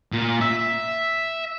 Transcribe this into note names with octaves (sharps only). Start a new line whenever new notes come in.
A#2
E5